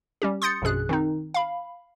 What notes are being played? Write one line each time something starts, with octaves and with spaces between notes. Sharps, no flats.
G3 C#4 G4
C6 D#6 G6 A6 C#7
A#1 F#2 B2 G#4 F#6
D#3 C4 D#4
F5 B5